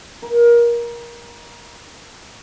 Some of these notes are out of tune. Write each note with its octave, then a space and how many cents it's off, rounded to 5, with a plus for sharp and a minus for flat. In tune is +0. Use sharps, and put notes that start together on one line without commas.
A#4 +25